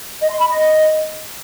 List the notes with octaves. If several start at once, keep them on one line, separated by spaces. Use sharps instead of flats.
D#5
C6
B5
D#5